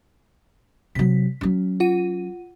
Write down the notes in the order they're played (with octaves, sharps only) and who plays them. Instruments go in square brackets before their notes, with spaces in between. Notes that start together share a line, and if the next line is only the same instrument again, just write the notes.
[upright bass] C3 F#3 [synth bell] B6
[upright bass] F#3 C#4
[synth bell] F4 F#5 D#7